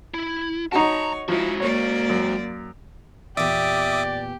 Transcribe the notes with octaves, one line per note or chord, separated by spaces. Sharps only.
E4
D#4 F#4 C#5 A5 A#5
F3 G#3 D#4 E4 F#4
A#3 C#5 D5
F#2
E2 A#2 G4 D5 E5 D6 D#6